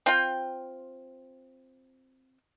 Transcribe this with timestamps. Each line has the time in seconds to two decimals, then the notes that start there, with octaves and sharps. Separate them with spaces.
0.06 C4 F4 G5